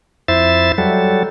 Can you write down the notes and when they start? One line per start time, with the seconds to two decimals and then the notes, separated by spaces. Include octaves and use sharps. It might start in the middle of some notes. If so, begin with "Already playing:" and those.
0.28 F2 E4 C5 E5 A6
0.78 F#3 G3 A4